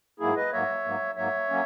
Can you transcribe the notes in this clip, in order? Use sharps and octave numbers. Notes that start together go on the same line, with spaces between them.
G#2 F#3 A#3 E4 G#4
B4 D#5
G#2 F#3 A#3 C#5 E5
G#2 F#3 A#3
G#2 F#3 A#3 C#5 E5
F#3 A#3 C#4